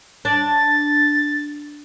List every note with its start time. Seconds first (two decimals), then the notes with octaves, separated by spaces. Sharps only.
0.25 D4 A6